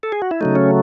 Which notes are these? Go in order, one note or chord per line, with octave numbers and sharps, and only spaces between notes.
A4
G#4
F#4
E4
C#3 F#3 A3 D#4
C#4